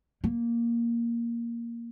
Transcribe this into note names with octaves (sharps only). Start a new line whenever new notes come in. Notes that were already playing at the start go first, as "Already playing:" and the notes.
A#3